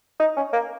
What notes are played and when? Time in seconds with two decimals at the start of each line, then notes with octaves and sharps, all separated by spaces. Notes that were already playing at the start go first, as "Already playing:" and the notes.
0.20 D#4
0.36 C#4
0.53 A#3